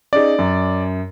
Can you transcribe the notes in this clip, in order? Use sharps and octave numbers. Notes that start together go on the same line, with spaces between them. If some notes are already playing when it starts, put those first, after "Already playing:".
C#4 D#4 G#4 D5
F#2